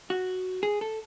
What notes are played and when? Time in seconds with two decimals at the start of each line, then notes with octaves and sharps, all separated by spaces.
0.10 F#4
0.63 G#4
0.81 A4